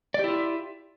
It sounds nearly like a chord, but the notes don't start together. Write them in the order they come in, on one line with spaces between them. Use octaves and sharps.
D5 G4 E4 F4 E5